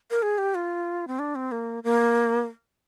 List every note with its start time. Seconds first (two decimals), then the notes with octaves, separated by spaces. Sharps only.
0.11 A#4
0.22 G#4
0.38 G4
0.55 F4
1.08 C4
1.19 D4
1.35 C4
1.52 A#3
1.84 A#3